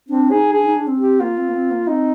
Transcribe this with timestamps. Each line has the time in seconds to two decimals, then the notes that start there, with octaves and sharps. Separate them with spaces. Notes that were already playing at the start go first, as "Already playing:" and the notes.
0.09 C4 D4
0.31 D#4 G#4
0.53 D4 G#4
0.64 D#4
0.75 D4
0.87 C4
0.98 G4
1.20 A#3 F4
1.37 C4
1.49 A#3
1.54 C4
1.71 A#3
1.87 C4 D#4